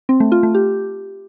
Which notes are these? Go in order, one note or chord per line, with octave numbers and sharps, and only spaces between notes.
C4
A3
F4
A3
G4